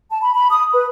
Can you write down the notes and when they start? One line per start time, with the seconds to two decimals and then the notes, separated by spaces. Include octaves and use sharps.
0.10 A5
0.22 B5
0.35 B5
0.51 D#6
0.73 B4